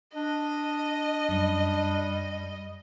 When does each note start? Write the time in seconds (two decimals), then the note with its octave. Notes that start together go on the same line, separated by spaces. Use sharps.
0.15 D4 D#5
1.29 F#2 G3